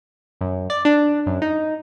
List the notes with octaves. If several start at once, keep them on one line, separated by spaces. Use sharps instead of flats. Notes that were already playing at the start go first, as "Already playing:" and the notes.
F#2
D5
D4
F#2
D#4